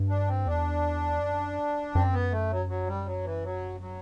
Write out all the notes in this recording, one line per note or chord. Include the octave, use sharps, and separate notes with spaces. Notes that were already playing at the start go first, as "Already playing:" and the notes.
Already playing: G2
D4
C4
E2 D4
F#2
F#2 C4
B3
A3
F#3
F#3
G3
F#3
E3
F#3
F#3